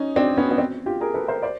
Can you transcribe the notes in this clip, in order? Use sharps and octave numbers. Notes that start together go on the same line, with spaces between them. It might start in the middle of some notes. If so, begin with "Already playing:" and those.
Already playing: C#4 D#4
C4 D4
B3 C#4
B3
C4
F4 G4
G#4 A#4
A4 B4
A#4 C5
C5 D5